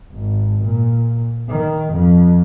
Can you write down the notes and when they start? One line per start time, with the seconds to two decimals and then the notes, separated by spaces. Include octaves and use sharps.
0.12 G#1
0.64 A#2
1.49 D#3
1.94 F2